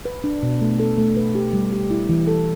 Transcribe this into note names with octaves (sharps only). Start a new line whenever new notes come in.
B4
D4
B2
A3
A4
A3
B4
G4
G3
G4
E4
E3
A4